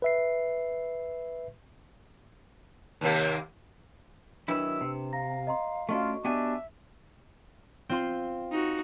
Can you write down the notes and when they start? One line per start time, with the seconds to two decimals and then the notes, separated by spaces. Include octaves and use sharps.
0.02 B4 E5 C7
3.01 D#2 C3 A#3
4.48 D#3 F#3 D4 E4 B4 E6 E7
4.81 C3
5.13 F5 A#5 A#6
5.47 D#5 A#5 C6
5.89 A3 C#4 D4 F4 F#4 D#5 C#6
6.25 B3 D4 G4 E5 G#5
7.89 C4 F4 C6
8.51 D#4 F#4